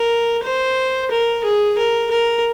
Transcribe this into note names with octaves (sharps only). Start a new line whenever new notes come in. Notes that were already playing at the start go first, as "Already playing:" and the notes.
Already playing: A#4
C5
A#4
G#4
A#4
A#4